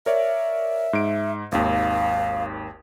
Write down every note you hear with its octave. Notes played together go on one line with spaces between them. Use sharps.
A#4 C#5 D5 E5
G#2 D7
G#1 D#2 F5